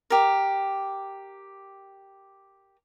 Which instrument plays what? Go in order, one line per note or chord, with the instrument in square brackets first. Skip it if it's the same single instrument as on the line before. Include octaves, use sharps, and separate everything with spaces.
[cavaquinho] G4 A#4